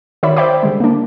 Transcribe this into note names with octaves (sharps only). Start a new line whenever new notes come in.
D#3 F#4 C#5 D5 E5 B5
C5 D5 E5 G5 B5 D6
D3 G3 G#3
A#3 D4